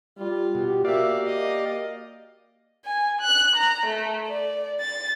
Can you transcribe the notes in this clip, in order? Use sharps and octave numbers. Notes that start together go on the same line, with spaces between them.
G3 F4
B2 G4
A#3 F#4 G4 D5 E5 F5
D#5
G#5
F#6
A#5
A3
D5
A6